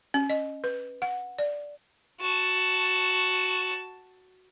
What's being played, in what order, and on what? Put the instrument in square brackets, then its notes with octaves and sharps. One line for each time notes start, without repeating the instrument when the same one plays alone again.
[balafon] C#4
D#5
B4
F#5
D5
[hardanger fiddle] F#4 A5